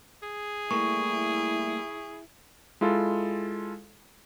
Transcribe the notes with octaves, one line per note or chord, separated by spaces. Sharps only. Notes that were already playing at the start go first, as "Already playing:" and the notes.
G#4
G3 A3 A#3 E4 C#6
G#3 E4 F4 A4